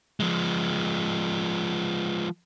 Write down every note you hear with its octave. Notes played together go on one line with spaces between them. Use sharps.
F3 G#3